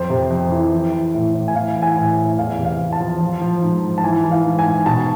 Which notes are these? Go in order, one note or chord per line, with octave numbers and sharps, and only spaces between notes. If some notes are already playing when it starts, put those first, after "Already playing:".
Already playing: F2 C5
C3
F2
E3
E3
E3
A2
A2
G#5
E3 F5
E3
G#5
A2
A2
E2 F5
C3
F5
E2
A5
F3
F3
F3
G#2
G#2
A5
E3 G#5
E3
F5
G#2
G#5
G#2
B2 A5